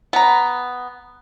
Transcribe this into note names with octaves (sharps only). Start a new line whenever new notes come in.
B3 A#5